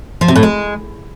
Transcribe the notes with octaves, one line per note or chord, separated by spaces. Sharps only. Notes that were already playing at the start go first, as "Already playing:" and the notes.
F3
C3
A2
G#3